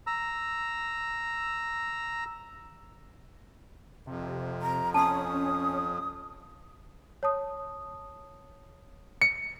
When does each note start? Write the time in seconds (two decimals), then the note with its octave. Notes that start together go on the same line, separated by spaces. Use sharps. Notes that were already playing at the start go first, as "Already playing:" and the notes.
0.07 A#5 E6
4.07 F2 C3
4.62 A#5
4.94 C#4 A5 C6 D#6
7.23 C#5 A5 D#6
9.22 C#7